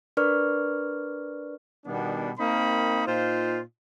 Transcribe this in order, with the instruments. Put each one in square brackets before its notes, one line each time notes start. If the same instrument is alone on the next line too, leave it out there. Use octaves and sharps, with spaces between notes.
[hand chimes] D4 A#4 B4 D5 C#6 F6
[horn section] B2 D#3 G3 B3 D4
A#3 C4 D#4 A#4 B5
A#2 D#4 F4 C5